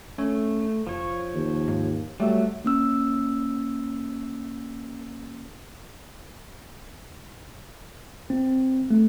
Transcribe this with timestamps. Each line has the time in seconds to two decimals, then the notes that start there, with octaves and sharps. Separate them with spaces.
0.18 A3 C#4
0.87 F1 F3 C#5
1.35 D#2
1.68 G#2
2.20 F#3 G3 A3
2.64 A#3 C#4 E6
8.30 C4
8.91 A3